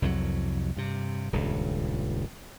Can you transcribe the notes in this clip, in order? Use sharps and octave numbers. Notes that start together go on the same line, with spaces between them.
C2 F2 E3 F#3
G2 C3
D#1 C#2 G2